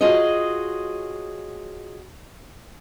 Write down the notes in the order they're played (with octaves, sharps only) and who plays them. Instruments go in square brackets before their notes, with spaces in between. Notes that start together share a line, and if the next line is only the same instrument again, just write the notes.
[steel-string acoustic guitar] F4 F#4 G#4 C#5 D#5